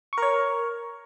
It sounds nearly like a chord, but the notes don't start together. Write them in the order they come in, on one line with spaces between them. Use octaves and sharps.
C#6 A#4 C#5